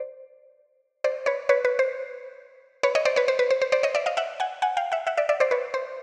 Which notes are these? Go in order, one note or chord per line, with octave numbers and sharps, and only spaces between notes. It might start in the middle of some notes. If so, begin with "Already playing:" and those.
Already playing: C5 D5
C5 D5
B4 C#5
B4 C#5
B4
C5
B4 C#5
C#5 D#5
C5 D5
B4 C#5
C5
B4
C5
C5
C5 D5
C#5 D#5
D5 E5
D#5 F5
E5 F#5
F#5 G#5
F#5 G#5
F5 G5
E5 F#5
E5 F#5
D5 E5
D5 E5
C5 D5
B4 C#5
C5